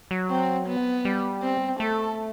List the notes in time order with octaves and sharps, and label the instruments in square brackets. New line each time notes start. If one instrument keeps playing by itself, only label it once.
[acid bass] F#3
[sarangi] C4
B3
[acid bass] G3
[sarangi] C4
[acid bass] A3 [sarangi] A4